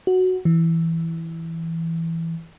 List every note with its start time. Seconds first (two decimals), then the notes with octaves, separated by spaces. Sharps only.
0.07 F#4
0.45 E3